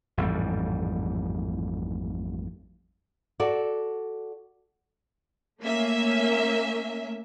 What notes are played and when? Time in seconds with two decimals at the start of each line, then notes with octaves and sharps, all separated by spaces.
0.17 A1 F2 G#2 G3
3.40 F#4 A4 D5
5.60 A3 A#3 C#4 E5